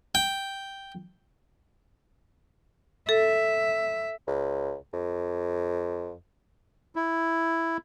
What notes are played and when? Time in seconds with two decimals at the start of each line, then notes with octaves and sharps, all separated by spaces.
0.15 G5
3.09 A4 E5
4.27 C#2
4.93 F2
6.96 E4